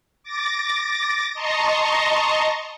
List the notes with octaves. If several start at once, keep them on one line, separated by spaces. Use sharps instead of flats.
D6 A6 A#6
D#5 A5 A#5 C6 C#6